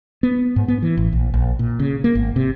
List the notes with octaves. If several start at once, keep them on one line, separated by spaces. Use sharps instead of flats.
B3
G#2
B3
E3
A1
A#1
A#1
A#2
C#3
A#3
G#1
C3